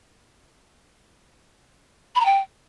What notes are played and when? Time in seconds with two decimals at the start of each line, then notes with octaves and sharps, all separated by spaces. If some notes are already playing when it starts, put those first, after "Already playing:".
2.15 B5
2.20 A#5
2.25 G5